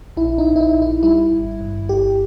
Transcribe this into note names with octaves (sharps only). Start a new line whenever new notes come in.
A#1 E4
D#4
A#1
E4
D#4
A#1
E4
G3 E4
G#1
G2
G1 G4